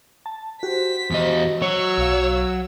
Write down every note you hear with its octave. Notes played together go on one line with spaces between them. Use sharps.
A5
F#4 G4 C5 B6
E2 D#5
F#3 C#5 E6
B1 F5